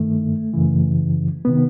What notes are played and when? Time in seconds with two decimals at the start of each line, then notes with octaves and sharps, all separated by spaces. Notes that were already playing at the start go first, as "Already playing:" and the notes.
Already playing: G2 D#3 A3
0.53 F#2 C#3 E3
1.45 C3 D#3 B3